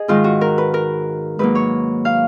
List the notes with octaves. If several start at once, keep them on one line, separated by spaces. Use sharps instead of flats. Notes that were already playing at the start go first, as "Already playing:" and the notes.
Already playing: G#4 D#5
G#2 D#3 G#3 F4
F#4
A#4
B4
A#4
G#2 F#3 A#3 B4
C#5
F5